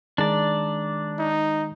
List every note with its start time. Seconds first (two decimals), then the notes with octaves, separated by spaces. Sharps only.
0.18 D#3 G#3 D4 D5 A#5
1.19 D#4